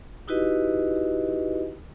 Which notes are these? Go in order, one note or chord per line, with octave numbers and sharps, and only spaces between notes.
D#4 E4 F#4 G4 B4 D#5